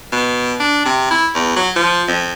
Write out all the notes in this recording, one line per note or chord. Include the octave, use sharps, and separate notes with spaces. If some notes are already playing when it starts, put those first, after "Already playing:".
B2
D4
C3
E4
E2
F#3
F3
F2